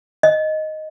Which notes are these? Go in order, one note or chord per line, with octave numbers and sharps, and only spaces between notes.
D#5